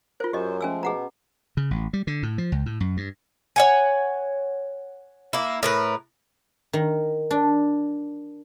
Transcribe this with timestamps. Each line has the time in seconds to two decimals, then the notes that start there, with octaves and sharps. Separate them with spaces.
0.20 F4 A#4 C5
0.33 F#2 F#3 G4 C5 D#5
0.61 F3 G#3 A3 C#4 G#5 E6
0.83 B2 G#4 F#5 A#5
1.57 C#3
1.71 A1
1.93 G3
2.07 D3
2.23 A2
2.38 F3
2.52 C#2
2.66 A2
2.80 F#2
2.97 G2
3.56 C#5 F#5 G#5
5.33 A#3 E4
5.63 A2 A#4 B4
6.73 D#3
7.31 D4